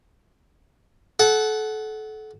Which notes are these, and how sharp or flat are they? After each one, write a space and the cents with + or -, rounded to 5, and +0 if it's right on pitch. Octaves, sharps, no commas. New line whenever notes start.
A4 -30 F#5 +10